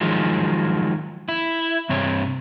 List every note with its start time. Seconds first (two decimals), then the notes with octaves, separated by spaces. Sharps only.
0.01 D#3 F3 F#3 G#3
1.29 E4
1.89 G2 C3 C4 C#5